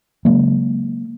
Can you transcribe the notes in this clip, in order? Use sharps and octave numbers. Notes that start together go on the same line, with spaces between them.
C#3 F#3 G#3 A#3